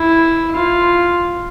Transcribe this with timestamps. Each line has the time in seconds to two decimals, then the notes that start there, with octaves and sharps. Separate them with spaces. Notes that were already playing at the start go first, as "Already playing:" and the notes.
Already playing: E4
0.56 F4